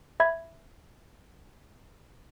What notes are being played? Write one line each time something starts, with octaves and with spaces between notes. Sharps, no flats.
E5 B5 G#6